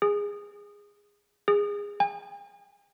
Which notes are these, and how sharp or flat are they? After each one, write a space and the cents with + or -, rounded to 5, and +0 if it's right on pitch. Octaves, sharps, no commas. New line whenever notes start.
G#4 -15
G#4 -20
G#5 -45